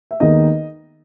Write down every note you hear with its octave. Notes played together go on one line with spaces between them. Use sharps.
E5
D#2 D#3 G#3 B3 D#4 D#5